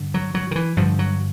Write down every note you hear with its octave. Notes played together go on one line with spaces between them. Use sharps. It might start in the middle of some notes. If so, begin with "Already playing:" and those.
Already playing: G2 D3
F#3
F#3
D#3
E3
G2 D3 F3
F#3